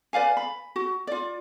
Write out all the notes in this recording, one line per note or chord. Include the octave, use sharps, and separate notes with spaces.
B4 D5 F5 G#5
B5
F#4
F4 D5